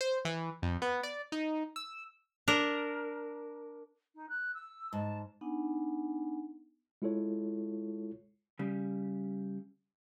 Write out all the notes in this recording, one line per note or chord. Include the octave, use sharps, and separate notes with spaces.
C5
E3
F2
B3
D5
D#4
E6
D4 A#4
D#4
F#6
E6
G#2 A5
B3 D4 D#4 F#5 G#5
G#3 E4 F4 A4 C#5
C#3 G3